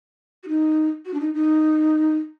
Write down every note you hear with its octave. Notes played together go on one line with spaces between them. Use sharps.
F#4
D#4
F#4
D4
D#4
D#4